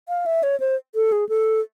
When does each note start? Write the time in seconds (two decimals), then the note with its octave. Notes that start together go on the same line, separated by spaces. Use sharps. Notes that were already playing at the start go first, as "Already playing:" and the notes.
0.09 F5
0.26 E5
0.43 C#5
0.60 C5
0.95 A4
1.12 G#4
1.29 A4